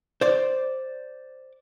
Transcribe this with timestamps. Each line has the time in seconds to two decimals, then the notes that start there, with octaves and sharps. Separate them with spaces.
0.21 C5 D5